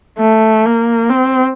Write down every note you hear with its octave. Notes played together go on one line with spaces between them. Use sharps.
A3
A#3
C4